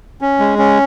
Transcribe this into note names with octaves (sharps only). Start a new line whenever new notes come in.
C#4
G#3
C#4